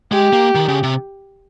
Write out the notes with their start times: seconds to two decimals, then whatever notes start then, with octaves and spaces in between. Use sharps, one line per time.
0.12 G#3 G4
0.33 A#3
0.55 D#3
0.68 C#3
0.83 C3